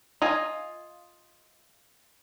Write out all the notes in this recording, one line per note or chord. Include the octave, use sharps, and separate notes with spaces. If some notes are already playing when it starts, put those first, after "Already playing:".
F4 D#5 G#5